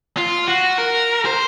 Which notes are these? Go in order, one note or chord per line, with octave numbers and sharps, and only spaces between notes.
F4
F#4
A#4
C5